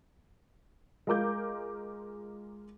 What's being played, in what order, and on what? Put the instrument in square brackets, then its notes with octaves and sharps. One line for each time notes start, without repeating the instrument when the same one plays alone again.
[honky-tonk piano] G#3 F4 A#4 D6 G6